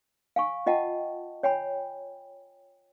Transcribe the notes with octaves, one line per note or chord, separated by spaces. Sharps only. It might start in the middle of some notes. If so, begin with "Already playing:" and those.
F5 G#5 C#6
F4 D#5 F#5 G5 A5
C#5 G5 G#5 B5